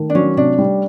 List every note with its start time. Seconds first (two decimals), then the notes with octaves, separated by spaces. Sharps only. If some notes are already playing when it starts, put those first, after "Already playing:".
Already playing: D#3 A3
0.10 D4
0.15 F#3 C#4
0.37 C3 D4
0.58 G3